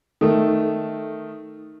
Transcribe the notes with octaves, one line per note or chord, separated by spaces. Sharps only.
D#3 A3